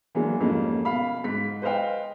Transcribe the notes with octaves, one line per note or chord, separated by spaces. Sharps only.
E3 F#3 G#3 A#3 D4
F2 G#2 G3 A#3 C#4
B2 F5 B5
G#2 B6
B4 C5 D#5 F5 G5